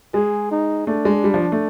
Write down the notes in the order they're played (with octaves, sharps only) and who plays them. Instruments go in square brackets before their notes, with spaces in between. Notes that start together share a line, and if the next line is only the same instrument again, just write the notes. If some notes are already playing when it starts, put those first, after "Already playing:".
[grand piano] G#3 [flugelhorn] G#4
[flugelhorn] D#4
[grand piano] A3 [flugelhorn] D4
[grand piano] G#3
G3
F3
A3